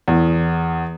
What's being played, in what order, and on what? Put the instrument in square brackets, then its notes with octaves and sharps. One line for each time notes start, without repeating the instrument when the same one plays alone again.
[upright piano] E2